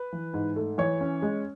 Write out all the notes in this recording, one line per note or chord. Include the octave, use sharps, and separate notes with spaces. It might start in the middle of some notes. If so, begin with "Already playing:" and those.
Already playing: B4
E3
G#2
A3
E3 C#5
C#4
G#3